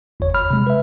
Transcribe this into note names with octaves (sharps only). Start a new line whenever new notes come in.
G1 E2 C#5
B5 F6
C3 G#3
B4 E5